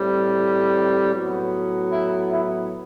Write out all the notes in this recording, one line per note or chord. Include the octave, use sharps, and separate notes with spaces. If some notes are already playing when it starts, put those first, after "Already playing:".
Already playing: A2 G3 C4
A2 F#3 B3
E4
E4